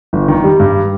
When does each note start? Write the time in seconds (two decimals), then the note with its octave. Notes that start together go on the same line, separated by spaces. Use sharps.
0.13 G1
0.28 D#3
0.44 G3
0.60 G2